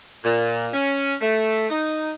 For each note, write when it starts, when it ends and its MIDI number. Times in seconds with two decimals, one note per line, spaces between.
0.24 0.67 46
0.74 1.15 61
1.21 1.68 57
1.70 2.12 63